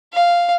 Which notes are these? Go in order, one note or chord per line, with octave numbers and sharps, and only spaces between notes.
F5